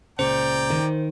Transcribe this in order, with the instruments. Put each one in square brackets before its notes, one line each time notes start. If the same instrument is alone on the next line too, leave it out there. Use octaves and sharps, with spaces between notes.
[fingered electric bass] C#2 A#2 C#3 [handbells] C5 [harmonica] D5 G5 A#5
[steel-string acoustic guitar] D#3